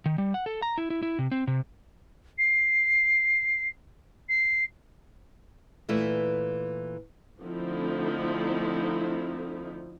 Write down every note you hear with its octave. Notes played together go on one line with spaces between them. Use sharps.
D#3
G3
F#5
A4
A#5
E4
E4
E4
C3
C4
C3
C7
C7
A#2 E3 A3
D3 F3 A3 C4 D#4 E4